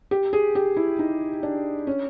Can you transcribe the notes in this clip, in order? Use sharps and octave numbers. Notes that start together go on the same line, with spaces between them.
G4
G#4
G4
E4
D#4
D4
C#4